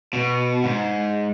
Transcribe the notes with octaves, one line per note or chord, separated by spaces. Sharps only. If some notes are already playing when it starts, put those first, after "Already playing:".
B2
G#2